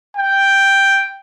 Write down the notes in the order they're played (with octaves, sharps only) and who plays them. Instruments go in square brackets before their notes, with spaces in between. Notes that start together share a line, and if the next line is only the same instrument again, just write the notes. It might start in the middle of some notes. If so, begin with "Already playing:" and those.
[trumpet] G5